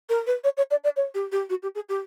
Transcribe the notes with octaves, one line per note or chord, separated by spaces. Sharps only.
A#4
B4
C#5
C#5
D5
D5
C#5
G4
G4
F#4
G4
G#4
G4